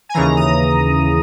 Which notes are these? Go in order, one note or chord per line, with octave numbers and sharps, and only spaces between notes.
G#5
D#2 C#3 E3 A#5
D#6